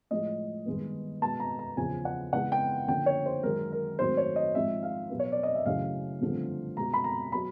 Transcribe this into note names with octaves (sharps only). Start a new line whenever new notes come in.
A2 F3 G#3 D#5
G2 D#3 G#3 B3
B2 G#3 B3 A5
A#5
A#5
E2 C#3 F3 G#5
F#5
C#3 E3 G#3 B3 F#5
G5
D3 F3 A#3 C#4 G5
C#5
C5
F#2 D#3 G#3 A#4
A#4
G#2 D#3 F#3 A3 C4 C5
C#5
D#5
G#2 F3 G#3 C4 E5
F5
B2 F#3 B3
C#5
D5
D#5
E5
F#2 C#3 E3 A3 C#4 F5
G2 D3 F3 A3 C4
B2 G#3 B3 A#5
B5
A#5
F#3 B3 B5